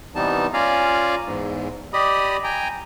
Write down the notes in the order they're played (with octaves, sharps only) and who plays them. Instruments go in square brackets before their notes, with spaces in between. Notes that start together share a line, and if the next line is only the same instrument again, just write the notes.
[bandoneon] C3 E3 G3 B3 D#4 A5
C#4 F4 D5 F5 G#5 A#5
E2 G#2
G4 D5 D#5 B5 D#6
G5 G#5 A#5